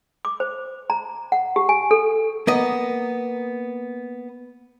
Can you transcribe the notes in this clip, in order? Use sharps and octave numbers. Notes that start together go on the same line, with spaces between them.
D6
C5
A#5
F#5
G4
G#5
A4
A#3 B3 D#5